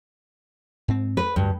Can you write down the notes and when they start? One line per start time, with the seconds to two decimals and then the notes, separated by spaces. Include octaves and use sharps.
0.88 G#2 C4
1.17 B4
1.36 D2 G2